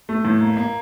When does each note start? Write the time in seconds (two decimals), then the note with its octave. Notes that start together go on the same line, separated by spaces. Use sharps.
0.09 A3
0.25 A2
0.41 A#3
0.57 A#3